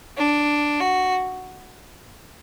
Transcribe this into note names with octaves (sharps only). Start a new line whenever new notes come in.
D4
F#4